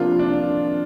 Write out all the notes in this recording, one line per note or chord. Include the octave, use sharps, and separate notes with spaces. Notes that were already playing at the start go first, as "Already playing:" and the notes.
Already playing: C3 F3 A#3 D4 F4
D4